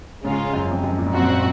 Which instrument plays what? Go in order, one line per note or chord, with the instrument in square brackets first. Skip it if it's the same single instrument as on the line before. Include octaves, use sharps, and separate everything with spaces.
[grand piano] G#2 [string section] C#3 G#3 C#4 F4
[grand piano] F#2
F2
F#2
A#2
G#2
[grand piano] F#2 [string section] A#2 F3 C4 F#4